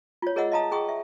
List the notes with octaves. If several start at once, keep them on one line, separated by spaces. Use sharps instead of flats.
F4 C#5
G#4 A#4 C#5 D#5 F#5 E6
D#5 F5 A5 A#5 D#6
G#4 G5 C#6 D#6
E5